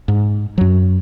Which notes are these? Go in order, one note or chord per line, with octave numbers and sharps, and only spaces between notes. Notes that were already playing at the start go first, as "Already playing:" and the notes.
G#2
F#2 F#3